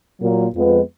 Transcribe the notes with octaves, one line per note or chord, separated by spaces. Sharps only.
A#2 F#3 A#3
F2 F3 G#3 B3